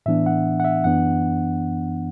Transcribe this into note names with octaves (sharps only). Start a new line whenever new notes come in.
A2 E3 B3 D4 E5
F#5
F#5
E5
F#2 E3 B3 D4 F#5